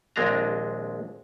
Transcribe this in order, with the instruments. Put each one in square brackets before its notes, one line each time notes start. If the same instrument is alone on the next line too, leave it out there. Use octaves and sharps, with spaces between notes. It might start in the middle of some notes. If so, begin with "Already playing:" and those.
[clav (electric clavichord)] A#1 D#2 G#3 C4 D4 A#5